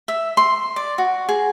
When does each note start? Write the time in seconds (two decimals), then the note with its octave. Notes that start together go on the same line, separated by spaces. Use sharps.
0.08 E5
0.37 C6
0.76 D5
0.98 F#4
1.29 G#4